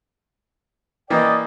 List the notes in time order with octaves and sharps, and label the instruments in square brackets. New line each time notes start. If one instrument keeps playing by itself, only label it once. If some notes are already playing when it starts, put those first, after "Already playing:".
[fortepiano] E3 A#3 [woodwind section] D5 D#5 G5